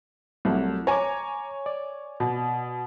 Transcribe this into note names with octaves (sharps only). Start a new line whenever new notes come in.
C2 F#3 A3 E4
C#5 G#5 A#5 D6
D5
B2